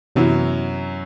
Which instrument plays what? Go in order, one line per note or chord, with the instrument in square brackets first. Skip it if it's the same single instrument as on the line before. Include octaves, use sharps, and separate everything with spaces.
[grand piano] F#2 F#3 [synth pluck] C3 E3 B3 E4